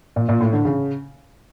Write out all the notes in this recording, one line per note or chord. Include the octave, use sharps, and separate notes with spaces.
A#2
A#2
A2
D3
C#3